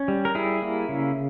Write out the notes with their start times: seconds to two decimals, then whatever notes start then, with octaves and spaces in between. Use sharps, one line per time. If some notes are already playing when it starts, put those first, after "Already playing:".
Already playing: C#4
0.08 G3
0.25 A#4
0.35 G3 E4 G#4
0.62 A#3
0.89 C#3